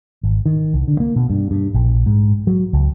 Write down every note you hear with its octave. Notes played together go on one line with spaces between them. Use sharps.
G#1
D#3
C2
D3
A#3
B2
G2
G2
A#1
G#2
F#3
C#2